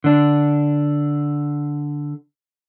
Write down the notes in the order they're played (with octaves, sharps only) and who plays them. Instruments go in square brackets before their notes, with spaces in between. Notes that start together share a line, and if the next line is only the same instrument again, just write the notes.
[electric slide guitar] D3 D4